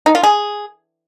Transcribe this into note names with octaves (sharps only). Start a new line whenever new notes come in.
D#4
F4
G#4